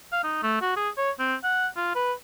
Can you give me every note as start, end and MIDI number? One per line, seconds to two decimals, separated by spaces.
0.12 0.23 77
0.24 0.42 63
0.43 0.56 57
0.61 0.75 66
0.76 0.89 68
0.97 1.11 73
1.19 1.35 60
1.44 1.67 78
1.76 1.94 65
1.95 2.13 71